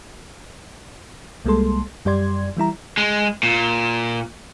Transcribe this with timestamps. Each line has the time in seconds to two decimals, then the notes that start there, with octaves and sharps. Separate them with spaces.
1.45 C2 G3 G#3 A#3 A4 C6
2.05 F#2 G3 G4 D5 C6 G#6
2.57 E3 G3 E4 A#5
2.97 G#3
3.43 A#2